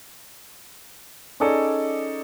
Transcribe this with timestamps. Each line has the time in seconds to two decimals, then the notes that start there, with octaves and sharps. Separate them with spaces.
1.40 C#4 D#4 G#4 A4 D5 D#5